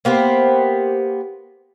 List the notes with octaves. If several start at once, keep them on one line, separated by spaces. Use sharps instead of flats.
A#3 B3 G4 C5